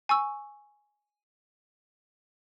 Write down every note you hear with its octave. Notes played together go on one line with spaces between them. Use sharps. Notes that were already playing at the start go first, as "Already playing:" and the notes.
G#5 C#6 E6